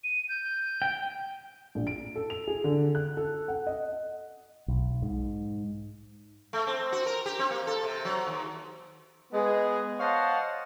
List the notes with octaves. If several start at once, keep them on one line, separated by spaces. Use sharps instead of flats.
D#7
G6
G5
A#1
D7
A4
F7
G#4
D3
F#6
A4
F#5
D#5
B1
G#2
A3
C4
F#4
A#4
G4
C4
A#3
A4
C3
F#3
D#2
G#3 B3 G#4
C5 C#5 D#5 F5 F#5 A5